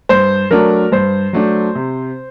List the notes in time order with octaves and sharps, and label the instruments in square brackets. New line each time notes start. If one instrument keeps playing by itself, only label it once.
[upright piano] G2 [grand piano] C5
[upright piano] F#3 A3 D4 [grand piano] A#4
[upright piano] G2 [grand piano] C5
[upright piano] F#3 A3 D4
C3